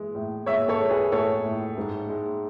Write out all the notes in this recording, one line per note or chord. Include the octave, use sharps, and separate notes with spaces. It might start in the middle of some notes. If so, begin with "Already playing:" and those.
Already playing: E3 G#3
A2
G#3 C#5 E5
A4 C#5
G#3
G#4 B4
A2 A4 C#5
A2
G#2
G#3